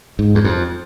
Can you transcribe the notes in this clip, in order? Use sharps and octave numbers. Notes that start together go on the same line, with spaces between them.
G#2
E2
F2